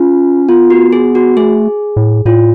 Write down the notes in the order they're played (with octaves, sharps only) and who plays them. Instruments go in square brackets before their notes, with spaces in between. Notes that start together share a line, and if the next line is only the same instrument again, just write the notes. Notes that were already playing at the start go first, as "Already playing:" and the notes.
Already playing: [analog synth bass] C#4 [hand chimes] F4
[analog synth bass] B3 [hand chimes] F4
[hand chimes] F#4
G#4
F#4
[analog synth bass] A3 [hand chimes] G#4
[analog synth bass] A2
[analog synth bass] A2 [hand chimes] F4